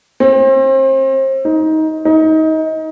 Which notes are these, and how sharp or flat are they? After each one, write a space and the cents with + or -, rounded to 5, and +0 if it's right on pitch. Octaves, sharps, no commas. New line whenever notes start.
C4 +35
D#4 +20
D#4 +25